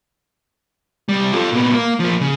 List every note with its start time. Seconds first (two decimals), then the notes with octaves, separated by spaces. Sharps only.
1.09 C3 G3
1.33 F4 A4
1.52 A#2 B3
1.73 A#3
2.00 F3 A#3
2.21 C#3